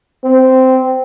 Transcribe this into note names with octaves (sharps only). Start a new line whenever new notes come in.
C4